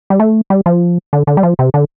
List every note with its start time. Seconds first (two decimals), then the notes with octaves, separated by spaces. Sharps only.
0.10 G3
0.20 A3
0.50 G3
0.66 F3
1.13 D3
1.27 D3
1.37 G3
1.43 F3
1.59 C3
1.74 D3